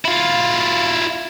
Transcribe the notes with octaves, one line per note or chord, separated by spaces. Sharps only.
E4 F4